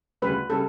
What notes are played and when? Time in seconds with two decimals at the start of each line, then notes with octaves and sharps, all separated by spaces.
0.22 D2 C#3 G3 B4
0.50 C#3 G3 A4